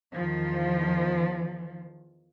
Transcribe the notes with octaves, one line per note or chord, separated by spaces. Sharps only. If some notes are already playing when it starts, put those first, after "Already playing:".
E2 D#3 F3